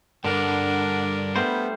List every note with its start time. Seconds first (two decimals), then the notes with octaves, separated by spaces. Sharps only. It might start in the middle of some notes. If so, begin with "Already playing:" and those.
0.25 G2 D3 D4 A#4 F#5
1.36 G3 A3 B3 C5